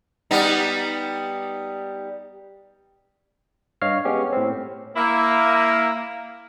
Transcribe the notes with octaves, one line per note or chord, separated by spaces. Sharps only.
G3 B3 D#4
G2 C#5 D#5 F5 F6
G#3 B3 C#4 G4
A2 C4
A#3 E4